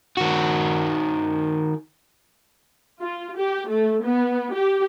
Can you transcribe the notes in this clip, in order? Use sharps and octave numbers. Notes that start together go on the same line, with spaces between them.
D#3 F#4
F4
G4
A3
B3
G4